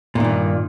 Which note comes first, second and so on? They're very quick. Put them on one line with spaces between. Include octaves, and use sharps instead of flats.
A#2 D#3 G2